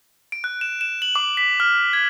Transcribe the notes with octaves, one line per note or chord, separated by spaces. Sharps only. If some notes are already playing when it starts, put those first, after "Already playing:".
D7
F#6
E7
E7
F#7
D6
B6
F6
G#6